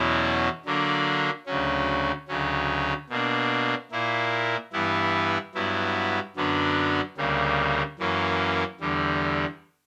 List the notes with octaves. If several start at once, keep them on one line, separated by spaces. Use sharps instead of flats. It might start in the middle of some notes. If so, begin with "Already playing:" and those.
Already playing: E2 B2 F#3 C#4 E4
D3 F#3 A#3 D4
D2 C#3 F#3 C#4
D2 C#3 F#3 C#4
B2 A#3 D4
A#2 A#3 E4
G2 E3 B3 E4
G2 F#3 B3 E4
F#2 D3 F#3 B3 D4
D2 C#3 G3 A#3
F#2 E3 A#3 C#4
E2 D3 G3